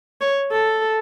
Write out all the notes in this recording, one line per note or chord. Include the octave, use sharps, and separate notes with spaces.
C#5
A4